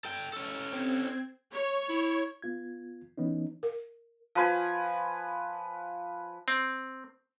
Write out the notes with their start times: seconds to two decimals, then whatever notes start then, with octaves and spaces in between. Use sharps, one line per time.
0.05 A4 G5
0.33 C#4 A4
0.73 C4 G#6
1.52 C#5
1.89 E4
2.42 B3 F4 G#6
3.18 E3 B3 C#4 D#4
3.63 A#4
4.35 F3 B4 G#5
6.48 C4